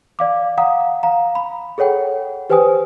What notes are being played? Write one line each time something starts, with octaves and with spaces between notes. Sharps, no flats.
D5 F5 D6
F5 F#5 A#5 D#6
F5 A#5
B5
G#4 A4 C#5 F#5 G5
G4 B4 C5 G5 G#5 D#6